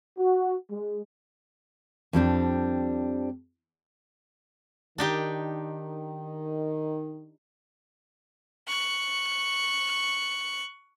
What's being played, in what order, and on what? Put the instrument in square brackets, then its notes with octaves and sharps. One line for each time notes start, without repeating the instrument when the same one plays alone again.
[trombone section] F#4
G#3
[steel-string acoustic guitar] F2 G3 C4 D4
[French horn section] D#3 [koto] D4 D#4 G4
[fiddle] C#6 F#6